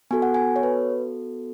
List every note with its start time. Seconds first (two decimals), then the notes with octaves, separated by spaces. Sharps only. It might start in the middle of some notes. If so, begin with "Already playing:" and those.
0.11 B3 F#4 A4 G#5
0.22 F#5
0.34 G#5
0.56 C#5
0.63 B4